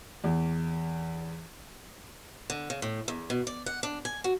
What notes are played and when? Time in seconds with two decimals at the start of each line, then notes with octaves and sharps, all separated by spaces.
0.24 E2
2.50 D3
2.70 C#3
2.82 A2
3.08 E2
3.30 B2
3.47 D5
3.66 F#5
3.83 D4
4.05 G#5
4.24 F#4